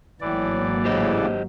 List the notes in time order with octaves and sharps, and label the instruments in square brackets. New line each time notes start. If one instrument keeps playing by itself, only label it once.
[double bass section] G#1 F#3 A#3 [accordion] A2 [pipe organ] E3 D5
[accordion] A2 C#3 [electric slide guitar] G4 C5 D#5